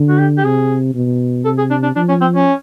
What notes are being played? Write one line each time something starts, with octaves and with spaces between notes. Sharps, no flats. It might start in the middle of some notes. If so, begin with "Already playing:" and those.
Already playing: D3
F#4
G4
G4
C3 G#4
B2
C3 A4
G#4
D4
D4
F3 D4
C#4
C4
C#4